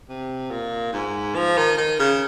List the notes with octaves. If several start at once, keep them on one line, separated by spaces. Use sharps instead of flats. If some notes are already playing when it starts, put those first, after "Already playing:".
C3
A#2
G#2
F3
D#3
D#3
C#3